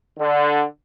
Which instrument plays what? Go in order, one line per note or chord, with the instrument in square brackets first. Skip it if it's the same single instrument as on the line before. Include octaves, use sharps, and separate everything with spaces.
[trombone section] D3